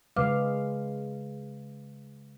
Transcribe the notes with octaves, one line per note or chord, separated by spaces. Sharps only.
C#3 G#3 B4 F5 D6 F6